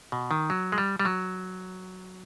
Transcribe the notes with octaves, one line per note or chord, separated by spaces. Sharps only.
B2
D#3
F#3
G#3
G3
G3
F#3